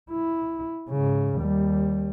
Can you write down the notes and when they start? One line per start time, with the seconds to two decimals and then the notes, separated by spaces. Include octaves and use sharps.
0.11 E4
0.90 G#2 C#3
1.37 D#2 G3